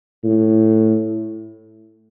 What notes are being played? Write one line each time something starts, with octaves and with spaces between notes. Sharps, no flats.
A2